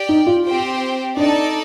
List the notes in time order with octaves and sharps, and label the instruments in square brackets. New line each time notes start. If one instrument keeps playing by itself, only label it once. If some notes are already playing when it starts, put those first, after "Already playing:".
Already playing: [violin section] G4 D5 G5
[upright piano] D#4
F4
[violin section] C4 G4 C5 G5
[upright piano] D4 [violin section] D#4 A4 D5 A5